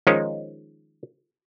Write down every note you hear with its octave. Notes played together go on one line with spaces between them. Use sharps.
D#3 F3 G#3 C#4 D#4